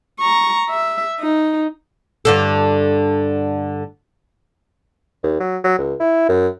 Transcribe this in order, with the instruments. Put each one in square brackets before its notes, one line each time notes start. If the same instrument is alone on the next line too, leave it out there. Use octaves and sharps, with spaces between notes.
[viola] A#5 C#6
E5
D#4
[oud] G2 D3 A4
[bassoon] D#2
F#3
F#3
C#2
E4
F#2